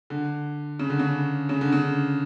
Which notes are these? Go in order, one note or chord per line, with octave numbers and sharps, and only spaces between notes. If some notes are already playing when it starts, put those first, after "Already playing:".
D3
C#3
D3
C#3
C#3
D3
C#3